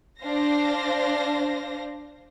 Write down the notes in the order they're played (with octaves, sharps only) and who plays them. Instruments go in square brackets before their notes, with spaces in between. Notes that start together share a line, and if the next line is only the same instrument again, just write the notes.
[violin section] D4 C5 F5 A#6